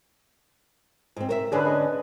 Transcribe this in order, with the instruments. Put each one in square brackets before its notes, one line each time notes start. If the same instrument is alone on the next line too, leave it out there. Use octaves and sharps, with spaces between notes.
[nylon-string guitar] G#2 C4
A#4 C5 E5
[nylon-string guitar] D3 C#4 D4 [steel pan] G#4 B4
[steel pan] D#5